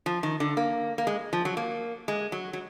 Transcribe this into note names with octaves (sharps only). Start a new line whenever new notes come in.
F3
D#3
D3
A#3
A#3
G#3
F3
F#3
A#3
G#3
F#3
F#3